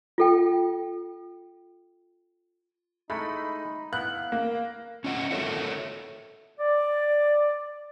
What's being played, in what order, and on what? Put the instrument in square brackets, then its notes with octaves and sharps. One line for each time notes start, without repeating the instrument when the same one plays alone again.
[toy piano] F4 A4 G5
[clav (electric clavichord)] G#3 A3 E4 [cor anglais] D#4 [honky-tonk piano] B5
[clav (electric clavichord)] B3 E4 [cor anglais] F5 [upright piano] F#6
[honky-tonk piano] A#3
[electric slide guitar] C#4 F4 D#5 F#5
F#4 A4 A#4 C#5 E5 F#5
[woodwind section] D5